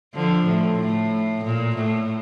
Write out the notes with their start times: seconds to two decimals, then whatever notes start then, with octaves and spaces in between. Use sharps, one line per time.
0.14 D3 F3
0.47 A2
0.80 A2
1.44 A#2
1.75 A2